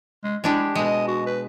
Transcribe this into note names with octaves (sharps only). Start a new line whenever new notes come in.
G#3
G#3 D4 E4 G4
B2 G#3 D#5
F#4
B4